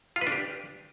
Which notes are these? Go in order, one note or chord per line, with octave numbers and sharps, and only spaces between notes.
F4
B4
D4
G4